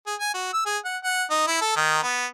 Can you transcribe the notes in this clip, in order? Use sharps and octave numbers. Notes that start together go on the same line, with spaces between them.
G#4
G#5
F#4
E6
G#4
F#5
F#5
D#4
E4
A4
D#3
B3